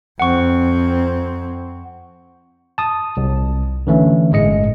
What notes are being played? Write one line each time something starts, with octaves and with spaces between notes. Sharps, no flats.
F2 C4 F#5 C#6
A5 D#6
C2
D3 E3 A3 C#4
G1 A2 G#3 D#5 C#7